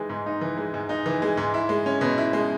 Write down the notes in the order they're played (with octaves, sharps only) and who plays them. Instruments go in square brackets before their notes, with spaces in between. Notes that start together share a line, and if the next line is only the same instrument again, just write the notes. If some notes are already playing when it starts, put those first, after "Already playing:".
Already playing: [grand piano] E3 G#3 D#4
G#2
D#4
E3
G#3
G#2
D#4
E3
G#3
G#2
E4
G#3
C#4
B2
E4
G#3